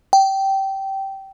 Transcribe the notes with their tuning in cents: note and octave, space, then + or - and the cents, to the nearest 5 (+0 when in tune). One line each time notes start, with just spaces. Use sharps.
G5 -15